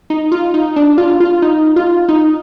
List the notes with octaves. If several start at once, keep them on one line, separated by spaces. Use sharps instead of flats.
D#4
F4
D#4
D4
F4
F4
D#4
F4
D#4